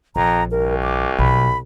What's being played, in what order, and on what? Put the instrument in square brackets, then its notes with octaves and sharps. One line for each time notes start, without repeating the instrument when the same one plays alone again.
[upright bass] A#1 [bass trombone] F2 [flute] A#5
[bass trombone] C2 [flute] A#4
[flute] D6
[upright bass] B1 [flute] B5